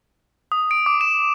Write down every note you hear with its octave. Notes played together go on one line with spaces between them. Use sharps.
D#6
D7
D6
E7